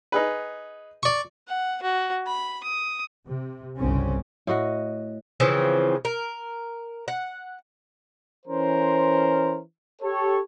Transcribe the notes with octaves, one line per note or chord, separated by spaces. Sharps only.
D#4 G#4 B4
D5 C#6
F#5
F#4
B5
D#6
C3
G1 C2 G2 C#3 C4 C#4
A2 F#4 D#5 F#5
C#3 E3 F3 C4
A#4
F#5
E3 C#4 A#4 C5
G4 A4 C#5